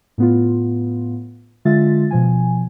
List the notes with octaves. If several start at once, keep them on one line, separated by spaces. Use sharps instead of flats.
A2 B3 F4
D3 G#3 F4 E5 A6
B2 F3 G#5